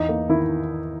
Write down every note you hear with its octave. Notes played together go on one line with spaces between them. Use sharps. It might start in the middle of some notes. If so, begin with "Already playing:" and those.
Already playing: E2 D#4
A#3
D#3 E4